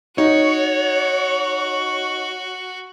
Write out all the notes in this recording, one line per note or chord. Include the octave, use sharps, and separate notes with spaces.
D#4 F#4 C#5